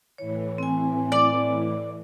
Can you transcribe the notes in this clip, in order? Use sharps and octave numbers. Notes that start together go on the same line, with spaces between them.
A2 E3 C#5
C4 G#5
D5